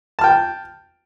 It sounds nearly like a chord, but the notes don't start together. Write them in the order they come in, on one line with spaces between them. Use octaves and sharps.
A5 F6 G5